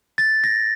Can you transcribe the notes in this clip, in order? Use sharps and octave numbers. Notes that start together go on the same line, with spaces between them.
A6
A#6